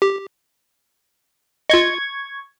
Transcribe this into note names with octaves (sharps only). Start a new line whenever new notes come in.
G4
F4 D#5 C#6 G#6